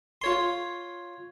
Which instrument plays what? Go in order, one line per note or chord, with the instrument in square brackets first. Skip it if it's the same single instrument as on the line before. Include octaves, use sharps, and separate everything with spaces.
[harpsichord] F4 C#5 C6